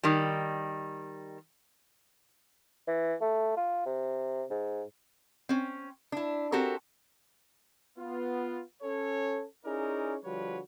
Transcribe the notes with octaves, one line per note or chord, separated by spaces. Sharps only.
D#3 G3
E3
A3
F4
C3
G#2
C4 C#4
D4 E4
C4 F#4 G4 A4 A#4
B3 F4
C#4 A4 C#5
C#4 D#4 E4 G#4 A#4 D5
D3 F3 G3 F#4 B4 C#5